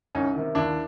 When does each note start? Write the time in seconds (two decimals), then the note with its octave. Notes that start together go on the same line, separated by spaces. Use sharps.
0.15 C2 C#4 D#4
0.35 C3 D#3
0.55 D#2 D4 E4